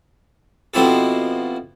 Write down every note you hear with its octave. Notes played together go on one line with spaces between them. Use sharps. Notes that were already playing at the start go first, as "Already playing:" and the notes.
B2 F3 C4 E4 G4 A4